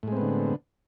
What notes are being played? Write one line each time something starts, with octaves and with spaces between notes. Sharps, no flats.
A2 D3 G#3 B3 C4